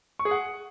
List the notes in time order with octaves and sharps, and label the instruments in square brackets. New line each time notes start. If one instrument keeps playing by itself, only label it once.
[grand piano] C#6
G#4
F#5